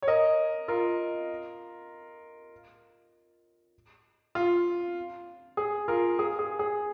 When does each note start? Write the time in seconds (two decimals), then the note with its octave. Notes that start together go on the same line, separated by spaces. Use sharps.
0.02 C#5
0.07 A#4 D#5
0.68 F4 A#4
4.35 F4
5.57 G#4
5.88 F4 A#4
6.19 G#4
6.39 G#4
6.59 G#4